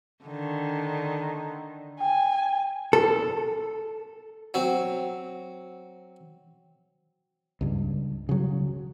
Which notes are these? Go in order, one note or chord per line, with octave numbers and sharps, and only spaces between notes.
D3 D#3
G5 G#5
A4
F#3 C4
C#2 G2
C#3 F#3